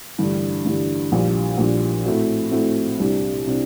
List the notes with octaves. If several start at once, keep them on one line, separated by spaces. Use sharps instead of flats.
A1 G2 D3 G3 D4
A1 G2 D3 G3 D4
A#1 A#2 G3 D4
A#1 A#2 G3 D4
A2 A3 C4 F#4
A2 A3 C4 F#4
C2 C3 G3 D4
C3 G3 D4